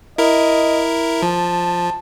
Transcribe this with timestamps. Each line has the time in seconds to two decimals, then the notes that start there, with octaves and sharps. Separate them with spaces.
0.18 E4 A#4 D#5
1.22 F3 A5